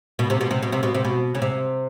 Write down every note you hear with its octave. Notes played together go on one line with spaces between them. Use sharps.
B2
C3
B2
C3
B2
C3
B2
C3
B2
C#3
C3